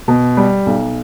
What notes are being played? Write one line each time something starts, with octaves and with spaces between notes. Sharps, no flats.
B2
G3
B1